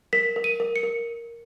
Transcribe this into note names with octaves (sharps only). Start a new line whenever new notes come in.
A#4 B6
A#4
D#7
A#4
C#7
A#4